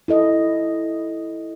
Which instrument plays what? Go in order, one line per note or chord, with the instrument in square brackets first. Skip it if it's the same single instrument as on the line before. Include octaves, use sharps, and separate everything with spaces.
[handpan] E4 A4 D#5